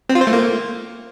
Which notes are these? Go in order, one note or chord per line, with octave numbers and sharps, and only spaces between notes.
C4
F4
C5
A3
A#3